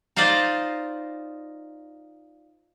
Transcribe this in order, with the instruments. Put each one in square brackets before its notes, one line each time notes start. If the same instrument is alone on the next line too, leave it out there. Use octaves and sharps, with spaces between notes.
[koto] D#4 F4 C5 D5 D#5